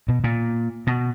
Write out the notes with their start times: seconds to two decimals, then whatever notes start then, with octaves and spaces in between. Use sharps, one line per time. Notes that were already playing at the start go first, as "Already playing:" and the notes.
0.08 B2
0.24 A#2
0.87 B2